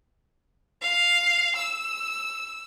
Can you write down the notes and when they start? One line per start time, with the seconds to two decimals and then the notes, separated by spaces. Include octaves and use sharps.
0.81 F5
1.56 E6